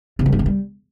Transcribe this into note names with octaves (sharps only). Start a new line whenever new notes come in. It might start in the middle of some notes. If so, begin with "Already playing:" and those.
C#3
G3
G#2
D3
G3